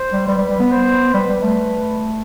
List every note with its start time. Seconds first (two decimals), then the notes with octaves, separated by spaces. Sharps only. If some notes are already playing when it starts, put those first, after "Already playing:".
Already playing: C5
0.13 G3
0.27 G3 B4
0.38 G3
0.49 G3
0.60 B3
0.71 C5
1.13 G3 B4
1.28 G3
1.43 A3